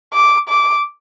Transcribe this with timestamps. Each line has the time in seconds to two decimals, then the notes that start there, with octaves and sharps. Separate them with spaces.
0.14 D6
0.49 D6